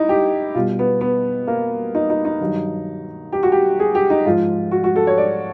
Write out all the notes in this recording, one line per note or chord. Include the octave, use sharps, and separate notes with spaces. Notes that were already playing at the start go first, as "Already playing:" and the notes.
Already playing: D#4 E4
G4
B2 G3 F4
B3
B3
A#3
D#4
D#4
D#4
G2 D#3 F#3
G4
F#4
G4
G#4
G4
D#4
G#2 F3 F4
F#4
F#4
A4
C#5
D5